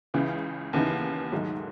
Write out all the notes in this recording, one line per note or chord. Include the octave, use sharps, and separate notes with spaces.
C#2 C#3 E3
D#2 C#3 E3 B3 D#4
G#2 D#3 F#3 A3 D#4